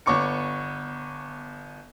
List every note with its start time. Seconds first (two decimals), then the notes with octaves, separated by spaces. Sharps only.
0.06 G1 B3 C#5 C#6 D6 C#7